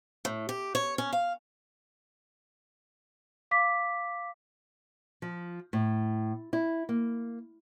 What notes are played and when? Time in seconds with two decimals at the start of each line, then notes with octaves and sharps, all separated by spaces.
0.25 A2
0.49 G4
0.75 C#5
0.98 C#4
1.13 F5
3.51 F5 D6 B6
5.22 F3
5.73 A2
6.53 E4
6.89 A#3